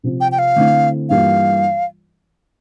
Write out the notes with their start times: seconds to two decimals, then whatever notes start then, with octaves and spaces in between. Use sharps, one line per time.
0.03 C3 F3 C4
0.20 G5
0.32 G5
0.39 F5
0.56 D3 A3 C4 E4
1.09 G2 E3 G3 A#3 F4 F5